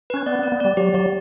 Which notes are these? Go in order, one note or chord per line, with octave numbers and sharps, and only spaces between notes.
C#4 B4
B3 D5
B3
D5
B3
G3 D5
F#3 G4
F#3 D5